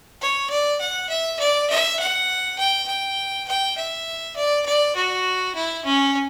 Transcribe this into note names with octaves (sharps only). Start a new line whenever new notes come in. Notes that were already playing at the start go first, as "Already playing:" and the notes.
C#5
D5
F#5
E5
D5
E5
F#5
G5
G5
G5
E5
D5
D5
F#4
E4
C#4